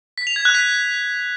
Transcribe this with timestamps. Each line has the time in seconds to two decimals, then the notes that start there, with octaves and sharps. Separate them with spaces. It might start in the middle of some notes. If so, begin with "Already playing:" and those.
0.18 B6
0.27 F7
0.36 G#6
0.45 F#6
0.55 B6